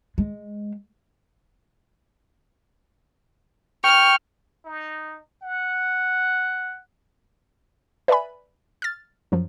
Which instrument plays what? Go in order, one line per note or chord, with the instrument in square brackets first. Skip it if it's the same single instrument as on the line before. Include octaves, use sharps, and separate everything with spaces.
[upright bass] G#3
[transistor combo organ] G5 C#6 [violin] F6
[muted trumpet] D#4
F#5
[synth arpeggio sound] B4 D5 E5 G#5 B5
F6 A6
F#2 F3 F#3